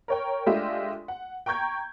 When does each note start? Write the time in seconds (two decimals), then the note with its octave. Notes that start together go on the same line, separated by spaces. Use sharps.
0.08 A#4 C#5 G5
0.46 G#3 A3 D4 F4 G4 E5
1.08 F#5
1.46 G5 A#5 C#6 G6 G#6